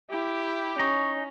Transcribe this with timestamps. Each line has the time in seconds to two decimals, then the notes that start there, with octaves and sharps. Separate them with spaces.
0.10 E4 G4
0.80 C#4 D#4 C#6